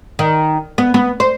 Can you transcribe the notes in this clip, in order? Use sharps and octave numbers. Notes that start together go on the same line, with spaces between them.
D#3
B3
B3
C5